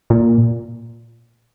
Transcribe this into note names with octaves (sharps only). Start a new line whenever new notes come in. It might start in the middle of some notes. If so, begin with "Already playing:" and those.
A#2